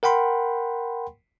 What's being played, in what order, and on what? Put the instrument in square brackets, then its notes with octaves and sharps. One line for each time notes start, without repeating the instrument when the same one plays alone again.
[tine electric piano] A#4 F#5 G5 B5 C6